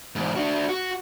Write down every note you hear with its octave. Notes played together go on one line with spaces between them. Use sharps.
E2 G#2
D4 F#4
F#4